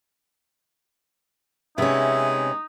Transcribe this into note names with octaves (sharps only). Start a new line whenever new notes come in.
C3 G#3 B3 C#4 D#4 E5